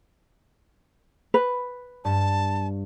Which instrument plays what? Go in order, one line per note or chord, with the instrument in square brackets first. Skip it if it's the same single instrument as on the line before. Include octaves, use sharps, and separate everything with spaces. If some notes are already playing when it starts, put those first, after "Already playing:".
[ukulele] B4
[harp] G2 [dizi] A5